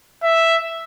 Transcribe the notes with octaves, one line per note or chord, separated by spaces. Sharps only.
E5